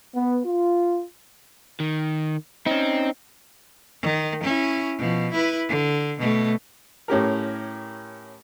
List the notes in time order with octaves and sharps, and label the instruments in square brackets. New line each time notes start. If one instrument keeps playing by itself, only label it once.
[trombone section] B3
F4
[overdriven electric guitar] D#3
[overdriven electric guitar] C4 [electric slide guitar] C#4 D#4
[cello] D#3
C#4 E4
B2 F3
E4 B4
D3
B2 A3
[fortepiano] A2 C#4 G4 A#4